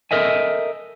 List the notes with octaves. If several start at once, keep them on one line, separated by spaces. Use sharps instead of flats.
A4 A#4 D#5 E5 G#5